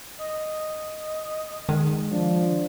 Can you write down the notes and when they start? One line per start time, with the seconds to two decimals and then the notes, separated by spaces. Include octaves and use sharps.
0.19 D#5
1.69 D#3 G#3
2.11 F3 D4